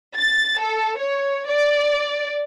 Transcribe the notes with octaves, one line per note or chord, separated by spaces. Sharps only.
A6
A4
C#5
D5